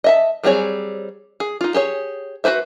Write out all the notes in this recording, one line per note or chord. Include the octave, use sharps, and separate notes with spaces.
D#5 E5 A5
F#3 G3 C4 G#4 C#5
G#4
D#4 F4
G4 G#4 C#5
F#4 G#4 B4 C5 E5